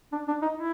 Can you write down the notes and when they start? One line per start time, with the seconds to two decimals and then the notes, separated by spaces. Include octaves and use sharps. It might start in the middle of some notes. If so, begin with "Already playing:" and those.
0.13 D4
0.28 D4
0.42 D#4
0.57 E4